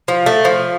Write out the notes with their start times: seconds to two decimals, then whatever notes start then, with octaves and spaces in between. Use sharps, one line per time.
0.08 F3
0.26 A3
0.45 F3